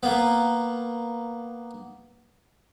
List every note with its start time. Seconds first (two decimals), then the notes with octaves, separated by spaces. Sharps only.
0.03 A#3 B3